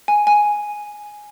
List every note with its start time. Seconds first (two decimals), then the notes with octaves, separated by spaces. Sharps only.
0.08 G#5
0.27 G#5